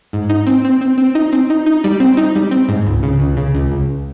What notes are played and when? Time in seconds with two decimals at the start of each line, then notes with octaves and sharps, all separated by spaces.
0.13 G#2
0.29 D#4
0.47 C4
0.65 C4
0.81 C4
0.98 C4
1.15 D#4
1.32 C4
1.50 D#4
1.66 D#4
1.84 G3
2.00 C4
2.17 D#4
2.35 G3
2.51 C4
2.69 G#2
2.86 C#2
3.03 C#3
3.20 C#2
3.37 C#3
3.55 C#2
3.71 C#2